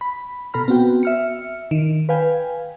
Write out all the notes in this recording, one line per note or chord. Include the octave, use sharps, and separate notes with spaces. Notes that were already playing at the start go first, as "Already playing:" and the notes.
B5
B2 A4 A#5 B5 F6
B3 C4 F#4 G5
E5 F6 C#7
D#3
B4 F5 G5 G#5